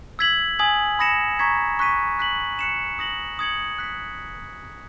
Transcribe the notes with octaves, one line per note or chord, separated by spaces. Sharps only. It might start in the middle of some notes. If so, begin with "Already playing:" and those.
E6 G#6 B6 F#7
G#5 D#6 G#6 B6 F#7
B5 D#6 A#6 C#7 E7
A#5 C#6 G#6 B6
C#6 F#6 B6 D#7
F#6 B6 F#7
F#6 C#7 E7
D#6 A#6 C#7 F#7
D#6 G#6 C#7 F#7
F#6 B6